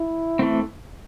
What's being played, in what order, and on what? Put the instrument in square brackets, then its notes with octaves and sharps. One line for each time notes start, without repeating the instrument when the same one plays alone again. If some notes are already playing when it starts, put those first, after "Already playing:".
Already playing: [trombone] E4
[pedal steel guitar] E3 A3 C4